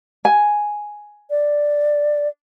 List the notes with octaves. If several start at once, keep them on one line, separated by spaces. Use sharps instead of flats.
G#5
D5